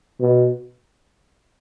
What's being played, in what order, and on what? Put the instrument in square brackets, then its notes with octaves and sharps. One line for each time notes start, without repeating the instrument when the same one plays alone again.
[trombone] B2